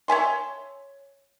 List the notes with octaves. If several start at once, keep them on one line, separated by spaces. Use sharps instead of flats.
C#5 E5 G#5 C6